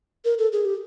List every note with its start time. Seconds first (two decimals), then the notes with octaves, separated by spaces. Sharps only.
0.25 A#4
0.39 A4
0.52 G#4
0.65 G4